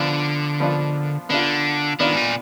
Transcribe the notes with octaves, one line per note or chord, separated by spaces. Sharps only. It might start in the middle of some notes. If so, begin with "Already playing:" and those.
Already playing: D3 F3 B3 D4 F4
F3 B3 D4 F4
D3 B3 D4 F4
D#3 B3 D4 F4
G#2
A#2